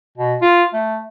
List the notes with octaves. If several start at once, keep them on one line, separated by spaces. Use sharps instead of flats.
B2
F4
A3